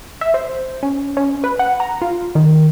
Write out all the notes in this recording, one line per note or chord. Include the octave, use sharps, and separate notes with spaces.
E5
C5
C#4
C#4
B4
F#5
A#5
F4
D#3